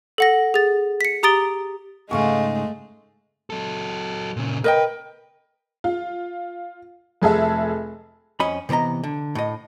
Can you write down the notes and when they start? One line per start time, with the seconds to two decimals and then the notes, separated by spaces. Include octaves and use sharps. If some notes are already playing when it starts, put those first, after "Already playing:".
0.18 A4 F#5 A#6
0.54 G#4 A6
1.01 B6 C#7
1.23 G4 A#5 D#6 A6 D7 G7
2.11 G#2 C#3 G#3 A3 D#4 F5 G#5 C#6
3.50 F#3 A4
4.37 A#2 C#3
4.64 A#4 B4 D#5 G5
5.84 F4
7.22 F1 G#4 A4 E5
8.40 F2 C#4 D#5 B5
8.69 C3 E3 B3 D#5 A#5
9.03 D3
9.35 A2 D#5